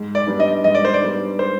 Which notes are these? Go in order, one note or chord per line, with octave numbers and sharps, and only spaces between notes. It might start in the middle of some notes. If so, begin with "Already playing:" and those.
Already playing: G#2
D5
G3 B3 D4
D#5
G#2 D#5
D5
C5
D5
G3 B3 D4
C5